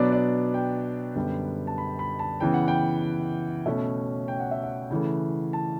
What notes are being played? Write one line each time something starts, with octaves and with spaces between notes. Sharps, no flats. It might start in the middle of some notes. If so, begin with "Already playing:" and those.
Already playing: B2 F#3 B3 D4 D5
D5
G5
F#2 D3 G3 B3
A5
B5
B5
A5
C#3 E3 B3 G5
F#5
G5
B2 A3 C#4 E5
G5
F#5
E5
F#5
C#3 E3 A3
A5